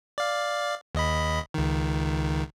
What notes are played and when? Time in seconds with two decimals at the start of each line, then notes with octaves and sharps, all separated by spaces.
0.18 D5 F5
0.95 D#2 D#5 B5
1.54 C#2 D#3